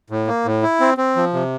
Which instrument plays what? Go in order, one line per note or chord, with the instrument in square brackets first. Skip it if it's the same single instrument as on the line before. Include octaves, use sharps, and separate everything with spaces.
[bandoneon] A2
A#3
A2
E4
C4
C4
F3
C3